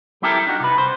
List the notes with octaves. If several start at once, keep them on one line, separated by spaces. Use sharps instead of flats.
G3 C4 E4 G4 A4 A#4
D4 D#4 F#4
C3 B4
C5